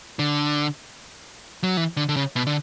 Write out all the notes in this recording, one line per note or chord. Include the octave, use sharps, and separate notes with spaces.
D3
F#3
E3
D3
D3
C#3
B2
D3